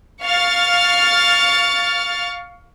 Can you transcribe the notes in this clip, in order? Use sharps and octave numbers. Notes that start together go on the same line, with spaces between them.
F5 C#6 F6 A6